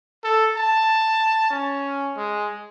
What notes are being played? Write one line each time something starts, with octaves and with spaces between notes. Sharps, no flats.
A4
A5
C#4
G#3